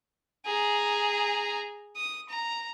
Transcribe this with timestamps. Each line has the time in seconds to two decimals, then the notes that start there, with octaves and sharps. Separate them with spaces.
0.46 G#4 A#5
1.96 D#6
2.29 A#5